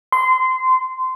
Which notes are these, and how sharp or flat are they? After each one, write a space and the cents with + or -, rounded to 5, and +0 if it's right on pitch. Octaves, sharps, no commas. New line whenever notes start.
C6 -20